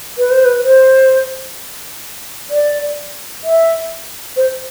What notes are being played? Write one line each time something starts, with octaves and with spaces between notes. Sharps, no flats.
B4
C5
B4
C5
D5
E5
C5